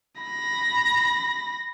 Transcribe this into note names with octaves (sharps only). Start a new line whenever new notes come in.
B5 A#6